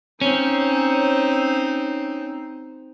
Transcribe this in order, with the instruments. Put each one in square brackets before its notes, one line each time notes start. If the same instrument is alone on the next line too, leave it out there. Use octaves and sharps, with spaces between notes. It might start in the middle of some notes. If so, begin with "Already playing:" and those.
[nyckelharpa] C4 D#4 [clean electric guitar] C#4